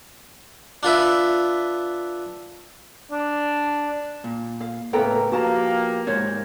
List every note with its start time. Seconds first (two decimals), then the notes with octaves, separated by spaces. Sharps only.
0.83 D4 F4 B4 E5
3.12 D4
4.24 A#2
4.61 F5
4.93 A2 C#3 A#3 B3 A4 G5 A#5
5.32 F3 A#3 F#4 G4 A5 A#5
6.07 G#2 A#3 C5 C#5